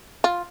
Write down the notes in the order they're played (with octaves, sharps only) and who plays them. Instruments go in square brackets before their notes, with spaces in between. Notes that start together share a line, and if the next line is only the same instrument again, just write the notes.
[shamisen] F4